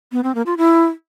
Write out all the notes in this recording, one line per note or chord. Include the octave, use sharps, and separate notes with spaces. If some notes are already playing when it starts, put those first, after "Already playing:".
B3
C4
A#3
F4
E4